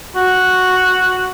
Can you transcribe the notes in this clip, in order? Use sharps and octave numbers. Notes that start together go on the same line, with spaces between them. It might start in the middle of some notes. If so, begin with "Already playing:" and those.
F#4